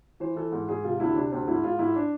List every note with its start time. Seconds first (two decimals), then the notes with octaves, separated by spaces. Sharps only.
0.20 E3 C5
0.36 E3 A4
0.52 G#2
0.68 G#2 G#4
0.84 C3 F4
1.00 D2 E4
1.15 C3 D4
1.32 D2 C4
1.48 G#2 E4
1.63 G#2 F4
1.79 G#2 E4
1.96 D4